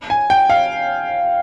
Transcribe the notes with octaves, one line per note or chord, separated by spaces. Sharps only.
G#5
G5
F5